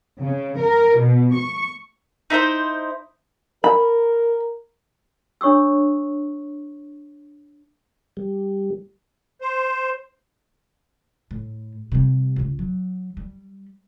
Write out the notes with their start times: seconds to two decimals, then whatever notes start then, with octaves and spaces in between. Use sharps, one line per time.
0.21 C#3
0.60 A#4
0.99 B2
1.34 C#6
2.30 D#4 E4 B4 C5
3.64 A#4 B5
5.41 D4 C#5 C#6 D#6 E6
8.17 G3
9.41 C5
11.31 A2
11.92 C3 G3
12.36 D1 C#2
12.59 F#3
13.17 G3